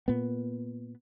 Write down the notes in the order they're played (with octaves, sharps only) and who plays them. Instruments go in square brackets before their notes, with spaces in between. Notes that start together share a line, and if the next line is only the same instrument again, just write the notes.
[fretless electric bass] A#2 B3